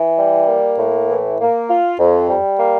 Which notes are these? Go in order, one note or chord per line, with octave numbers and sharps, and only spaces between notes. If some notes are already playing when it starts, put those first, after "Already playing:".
Already playing: E3
G3
A#3
A2
E3
A#3
F4
F2
G3
A#3